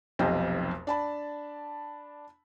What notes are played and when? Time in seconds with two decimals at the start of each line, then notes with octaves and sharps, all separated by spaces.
0.19 F1 B1 F2 G4 C5 D#5
0.87 D4 A5 B5